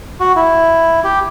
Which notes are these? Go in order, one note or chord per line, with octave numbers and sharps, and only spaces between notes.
F#4
E4
G4